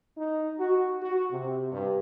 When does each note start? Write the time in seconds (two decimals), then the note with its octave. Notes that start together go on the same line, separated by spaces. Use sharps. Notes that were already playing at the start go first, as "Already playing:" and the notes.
0.17 D#4
0.59 F#4
1.02 F#4
1.30 C3
1.71 G2